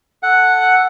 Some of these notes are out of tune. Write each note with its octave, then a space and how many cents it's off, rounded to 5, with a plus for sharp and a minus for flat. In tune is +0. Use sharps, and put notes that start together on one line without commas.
A4 +0 F#5 +0